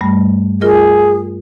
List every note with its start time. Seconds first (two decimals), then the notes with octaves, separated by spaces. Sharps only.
0.01 G2 G3 A3
0.61 F4 G#4 A#4 D#5